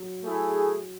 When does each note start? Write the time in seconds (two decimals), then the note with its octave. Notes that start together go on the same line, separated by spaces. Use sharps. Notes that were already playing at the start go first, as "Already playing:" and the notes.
Already playing: F#3 F#4
0.23 A3 E4 G#4